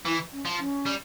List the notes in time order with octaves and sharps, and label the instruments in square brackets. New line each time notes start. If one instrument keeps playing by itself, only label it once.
[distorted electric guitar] E3 [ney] E4
[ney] C#4
[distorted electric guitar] F3
[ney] C#4
[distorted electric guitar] G3